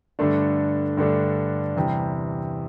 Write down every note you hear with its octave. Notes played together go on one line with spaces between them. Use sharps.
G2 D3 A3 D4
G2 D3 A3 D4
E2 C3 G3